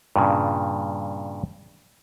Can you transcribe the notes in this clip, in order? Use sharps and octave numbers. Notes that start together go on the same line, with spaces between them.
G2 A#2 C#3